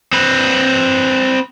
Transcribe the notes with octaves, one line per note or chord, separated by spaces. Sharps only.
C4 B4